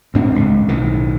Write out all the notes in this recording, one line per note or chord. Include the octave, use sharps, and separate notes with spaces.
D2 G#2 C4 D4
D#1 C#2
B1 A2 D#3